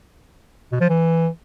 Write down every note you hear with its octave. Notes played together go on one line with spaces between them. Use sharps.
B2
F3
E3